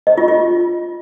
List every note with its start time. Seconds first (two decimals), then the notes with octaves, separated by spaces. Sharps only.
0.07 D#5
0.18 F4
0.28 F4